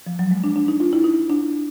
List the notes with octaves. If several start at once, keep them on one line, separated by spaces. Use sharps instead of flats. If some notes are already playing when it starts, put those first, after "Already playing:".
F3
F#3
G#3
D4
D4
D#4
F4
E4
D#4
D4